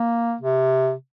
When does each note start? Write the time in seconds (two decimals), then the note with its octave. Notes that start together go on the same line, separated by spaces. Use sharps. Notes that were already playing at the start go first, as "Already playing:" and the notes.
Already playing: A#3
0.41 C3